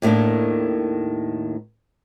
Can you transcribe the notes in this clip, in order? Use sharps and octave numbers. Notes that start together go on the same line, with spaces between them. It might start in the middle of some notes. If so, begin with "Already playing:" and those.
D#2 A2 D#3 A#3 D4